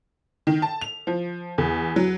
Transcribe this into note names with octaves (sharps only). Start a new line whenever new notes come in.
D#3
A5
F7
F3
E2
F#3